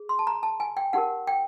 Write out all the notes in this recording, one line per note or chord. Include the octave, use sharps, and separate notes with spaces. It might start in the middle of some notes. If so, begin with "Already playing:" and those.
Already playing: G#4
C6
A5
A#5
A5
G#5
G5
D#4 G4 A#4 F#5
G5